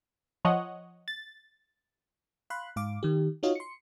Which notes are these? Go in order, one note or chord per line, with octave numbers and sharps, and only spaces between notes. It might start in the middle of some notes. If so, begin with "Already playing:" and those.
F3 C#5 D#5 F#5
A6
F5 B5 C6 F#6
G#2 F5 D6
D#3 G4
D#4 F4 F#4 C#5 D#5 F5
C6 C#7